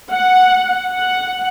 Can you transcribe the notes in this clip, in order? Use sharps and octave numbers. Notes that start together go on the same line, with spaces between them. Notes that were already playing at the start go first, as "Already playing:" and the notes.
F#5
F#5